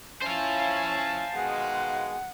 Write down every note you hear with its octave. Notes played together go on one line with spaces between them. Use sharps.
C#4 E4 C5 F5 G#5 A5
B2 D#3 G#3 F#5